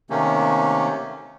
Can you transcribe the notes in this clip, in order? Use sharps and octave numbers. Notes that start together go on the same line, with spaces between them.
C3 D#3 A3 A#3 C#4